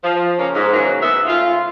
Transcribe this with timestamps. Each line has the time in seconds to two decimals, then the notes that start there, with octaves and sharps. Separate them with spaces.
0.04 F3
0.39 A#2 C#3 A#3 C#4 A#4
0.55 G#2
0.73 C#3 E3 F#3 A#3 C#4
1.03 G#2 B3 D#5 E5
1.27 C#3 A3 F4